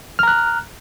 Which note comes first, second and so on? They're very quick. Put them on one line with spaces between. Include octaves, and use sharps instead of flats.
F6 A#5 F#6